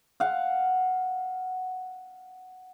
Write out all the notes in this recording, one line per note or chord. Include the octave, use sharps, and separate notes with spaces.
F5 F#5